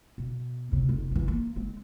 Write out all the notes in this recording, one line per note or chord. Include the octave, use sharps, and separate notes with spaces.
B2
A2 C3
F1
E3 F3
A#3
G#3 C4